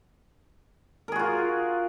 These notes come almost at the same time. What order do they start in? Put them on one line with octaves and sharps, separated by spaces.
A#4 G#4 F#4 F4